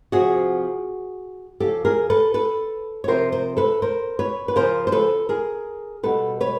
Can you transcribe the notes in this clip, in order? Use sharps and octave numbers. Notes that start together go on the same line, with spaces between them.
C3 F3 F#4 G#4
C#3 F3 G4 A4
G#4 A#4
A4 B4
A4 B4
C#5
C3 F3 A#4 C5
A#4 C5
A4 B4
A#4 C5
B4 C#5
B4
C#3 F3 A#4 C5
C5
A4 B4
G#4 A#4
B2 G3 A4 B4
B4 C#5